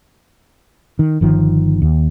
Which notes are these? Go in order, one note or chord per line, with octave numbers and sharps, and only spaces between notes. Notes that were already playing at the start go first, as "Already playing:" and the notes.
D#3
G1 D#3 F3
D#2